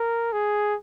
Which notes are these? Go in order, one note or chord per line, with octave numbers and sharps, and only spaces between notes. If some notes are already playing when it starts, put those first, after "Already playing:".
Already playing: A#4
G#4